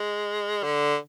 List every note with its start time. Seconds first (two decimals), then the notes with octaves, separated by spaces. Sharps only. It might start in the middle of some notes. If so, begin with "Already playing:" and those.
Already playing: G#3
0.63 D3